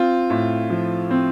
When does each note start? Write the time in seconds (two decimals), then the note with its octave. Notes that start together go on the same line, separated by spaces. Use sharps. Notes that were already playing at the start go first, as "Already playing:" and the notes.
Already playing: C4 F4
0.30 A2
0.70 F3
1.10 C4